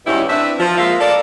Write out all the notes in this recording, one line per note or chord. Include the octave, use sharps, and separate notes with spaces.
E2 G#2 B2 G3 C#4 E4
C4 D4 B4 E5
F3
G#3 A#3 E4 F4 E5 F5
A4 A#4 D5